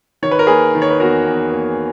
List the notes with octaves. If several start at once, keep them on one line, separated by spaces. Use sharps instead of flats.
D#3 C#5
B4
A#4
A#3 G#4 B4
D#3
C#5
B4
E2 F#4 A#4
E2
A#3